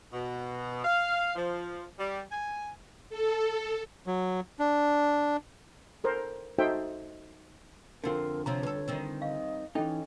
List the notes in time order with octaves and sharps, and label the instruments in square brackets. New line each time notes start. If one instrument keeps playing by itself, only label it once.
[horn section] B2
F5
F3
G3
G#5
[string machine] A4
[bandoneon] F#3
D4
[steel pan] A4 A#4 C5
D#4 F#4 A4 C5 E5 G5
[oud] F2 C4 [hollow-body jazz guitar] D3 F4 [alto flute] A#4
[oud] C3 F3 C4 [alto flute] C#5 [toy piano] A#5
[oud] G3 A4 [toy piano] B4
[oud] D#3 G3 C4
[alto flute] D#5 [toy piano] F5
[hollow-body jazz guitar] E3 D#4 [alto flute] C#4 [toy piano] A4 D#5 G5